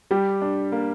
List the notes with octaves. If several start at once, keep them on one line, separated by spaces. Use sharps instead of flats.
G3 G4
D4
A#3